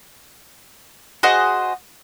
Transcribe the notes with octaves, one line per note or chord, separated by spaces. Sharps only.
F#4 G#4 C5 D#5